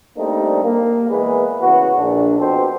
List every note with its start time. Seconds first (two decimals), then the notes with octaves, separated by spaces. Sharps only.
0.17 G3 A3 A#3 C4 D4 D#4
0.64 A#3
1.09 E2 E3 G#3 A#3 G#4 B4
1.61 C#3 E3 B3 F#4
1.97 A#1 A#2 D4
2.39 F2 B2 B3 G4 A4 C5